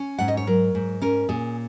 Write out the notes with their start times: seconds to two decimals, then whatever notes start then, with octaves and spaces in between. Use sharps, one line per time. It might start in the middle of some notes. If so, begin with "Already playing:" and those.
Already playing: C#4
0.18 G#2 F#5
0.28 D#5
0.37 C#5
0.47 F#3 A#4
0.75 G#2
1.02 C#4 A#4
1.29 A#2 G#4